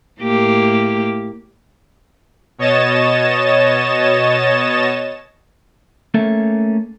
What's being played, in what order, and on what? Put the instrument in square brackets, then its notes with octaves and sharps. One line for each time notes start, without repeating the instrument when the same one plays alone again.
[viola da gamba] A2 A#3 G4
[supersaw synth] B2 C#5 D#5 A6 E7
[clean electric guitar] A3 A#3 C#4 A4 E5